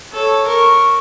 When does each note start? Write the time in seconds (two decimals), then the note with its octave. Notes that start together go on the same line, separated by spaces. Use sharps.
0.13 A4 C#5
0.47 A#4 C#6